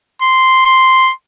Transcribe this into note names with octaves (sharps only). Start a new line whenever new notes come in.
C6
C6